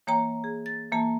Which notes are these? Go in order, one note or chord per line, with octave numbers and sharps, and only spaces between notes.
E3 A#3 C#5 G5 A#5
G#4
A6
E3 A#3 A5